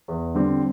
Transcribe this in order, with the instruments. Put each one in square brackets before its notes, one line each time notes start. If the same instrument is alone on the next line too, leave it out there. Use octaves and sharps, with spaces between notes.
[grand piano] E2
D3 G3 C4